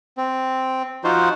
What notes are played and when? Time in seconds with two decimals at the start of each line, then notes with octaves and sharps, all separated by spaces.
0.17 C4
1.04 F3 D#4 F4 F#4 C5